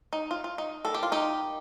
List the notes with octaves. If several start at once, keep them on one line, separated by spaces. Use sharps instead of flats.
D#4
F4
F4
D#4
D#3 G3 A#3 A4
G4
F4
D#4 G4